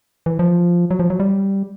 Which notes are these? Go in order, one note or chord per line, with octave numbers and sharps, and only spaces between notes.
E3
F3
F#3
F3
F#3
G3